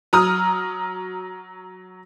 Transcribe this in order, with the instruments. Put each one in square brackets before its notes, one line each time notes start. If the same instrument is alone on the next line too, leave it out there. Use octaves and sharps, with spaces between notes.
[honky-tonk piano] F#3 A#5 D#6 F6